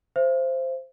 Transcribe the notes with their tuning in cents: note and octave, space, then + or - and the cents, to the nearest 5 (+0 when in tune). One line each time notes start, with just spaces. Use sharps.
C5 +0 E5 +40